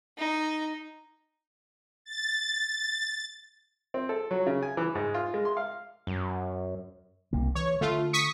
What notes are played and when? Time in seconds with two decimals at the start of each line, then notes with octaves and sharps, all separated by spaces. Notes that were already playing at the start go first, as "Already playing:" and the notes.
0.18 D#4
2.04 A6
3.94 C4
4.09 A4
4.31 F#3
4.46 C#3
4.62 G#5
4.77 E3
4.95 G#2
5.14 F4
5.34 G#3
5.45 C6
5.57 F5
6.07 F#2
7.33 C2 C3 A#3
7.55 E3 C#5
7.81 D3 A3 F4
8.13 C#6 D#6 B6